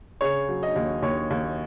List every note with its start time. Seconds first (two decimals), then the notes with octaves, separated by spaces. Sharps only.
0.21 C#3 C#5
0.49 F#3
0.63 D#5
0.76 D#2
1.02 D#2 C#5
1.30 D#2